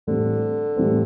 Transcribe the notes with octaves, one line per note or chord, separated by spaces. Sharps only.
A2 D3 E3 G3 C4
A2 E3 G3 C4